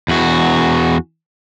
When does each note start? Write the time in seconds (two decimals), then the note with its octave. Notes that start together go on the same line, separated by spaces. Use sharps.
0.08 E2 F#4